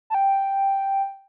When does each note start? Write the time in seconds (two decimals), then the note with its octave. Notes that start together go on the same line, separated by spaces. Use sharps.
0.10 A5
0.14 G5